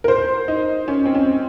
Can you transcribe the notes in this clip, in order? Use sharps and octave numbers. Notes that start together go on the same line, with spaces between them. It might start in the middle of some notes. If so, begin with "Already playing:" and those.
A#4
C5
D#4
C#4
C4
C#4